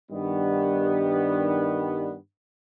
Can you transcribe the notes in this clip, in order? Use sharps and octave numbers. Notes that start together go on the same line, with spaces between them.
G2 D#3 G3 B3